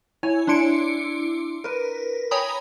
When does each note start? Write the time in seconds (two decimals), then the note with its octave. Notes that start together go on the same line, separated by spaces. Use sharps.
0.23 E4 C#5 G#5
0.47 D4 E4 C6 C#7 D7
1.64 A#4 B4
2.31 C#5 G5 G#5 A#5 B5 D#6